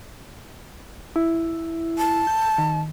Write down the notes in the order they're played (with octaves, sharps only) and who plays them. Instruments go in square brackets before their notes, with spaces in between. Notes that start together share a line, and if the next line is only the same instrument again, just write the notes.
[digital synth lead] E4
[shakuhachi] A5
[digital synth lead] G6
D#3